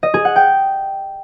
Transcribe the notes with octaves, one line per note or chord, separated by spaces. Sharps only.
D#5
G#4
F#5
G5